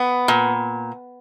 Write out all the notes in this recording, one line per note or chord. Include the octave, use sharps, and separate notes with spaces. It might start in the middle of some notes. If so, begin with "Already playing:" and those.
Already playing: B3
A#2